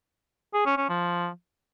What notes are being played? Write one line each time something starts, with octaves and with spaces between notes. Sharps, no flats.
G#4
C#4
C#4
F3